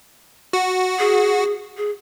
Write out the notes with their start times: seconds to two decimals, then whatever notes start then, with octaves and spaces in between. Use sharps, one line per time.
0.53 F#4
0.99 G#4
1.77 G#4